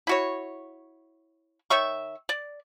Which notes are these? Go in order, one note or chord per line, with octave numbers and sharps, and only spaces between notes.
E4 F#4 C#5
D#3 C#5 E5 C#6
D5